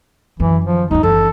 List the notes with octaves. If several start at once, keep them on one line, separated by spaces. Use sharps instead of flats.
F#2 D#3 E3
F3
D2 G2 D#4
F#1 E3 A4